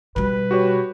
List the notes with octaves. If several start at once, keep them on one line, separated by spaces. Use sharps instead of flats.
B2 G3 B4
F#4 G4 C#5